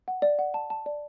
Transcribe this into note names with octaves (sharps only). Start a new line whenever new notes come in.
F#5
D5
F#5
A5
A5
D5